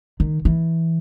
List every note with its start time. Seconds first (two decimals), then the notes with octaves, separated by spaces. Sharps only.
0.20 D#3
0.45 E3